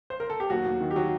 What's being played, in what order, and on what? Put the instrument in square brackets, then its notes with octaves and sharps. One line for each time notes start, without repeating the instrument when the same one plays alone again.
[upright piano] C5
A#4
A4
G4
D#2 F#3 F#4
D#2
D#3
G4
F#3 F#4